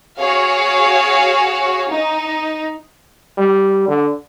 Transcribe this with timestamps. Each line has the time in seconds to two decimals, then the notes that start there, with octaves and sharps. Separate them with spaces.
0.19 F#4 G#4 C#5 F5
1.90 D#4
3.38 G3
3.88 D3